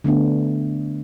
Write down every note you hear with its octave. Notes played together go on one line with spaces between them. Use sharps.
D3 A3 B3 D4